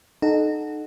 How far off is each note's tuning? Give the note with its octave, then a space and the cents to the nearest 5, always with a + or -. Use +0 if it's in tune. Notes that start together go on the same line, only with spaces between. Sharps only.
D#4 -25 A4 -25 F#5 +0